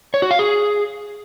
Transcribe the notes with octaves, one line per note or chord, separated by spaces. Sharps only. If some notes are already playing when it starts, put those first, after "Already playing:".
C#5
F#4
F5
G#4